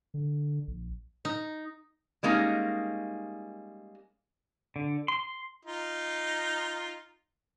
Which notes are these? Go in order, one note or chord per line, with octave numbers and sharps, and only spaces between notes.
D3
A#1
D#4
G3 G#3 A#3 C#4 D#4
D3
C6
D#4 F4